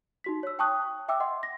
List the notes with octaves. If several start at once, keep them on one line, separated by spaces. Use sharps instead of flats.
D#4 F#4 B6
C#5 E6
G5 A5 C#6 D#6 F#6
E5 G5 D6 E6
D#5 F#5 C6
A#6